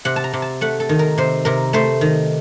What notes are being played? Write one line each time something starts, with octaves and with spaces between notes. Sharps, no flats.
C3 F#5
A5
A#5
C3
A5
A3 F#5
A4
D#3
A#4
C3 C5
C3 A#4
A3 C5
D#3